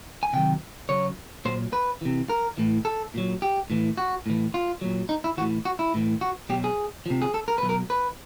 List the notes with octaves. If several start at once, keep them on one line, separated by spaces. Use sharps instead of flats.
G#5
C3 D#3 F#3 G5
C#3 F#3 C#5
A#2 F#3 C5
B4
C3 E3
A#4
A2 E3
A4
A#2 F#3
G4
A2 E3
F#4
A2 E3
F4
A#2 F#3
D#4
E4
A2 E3 F#4
F#4
E4
A2 E3
F#4
B2 F#3 G4
G#4
C3 F3
G#4
A4
A#4
B2 F#3 B4
A#4
B4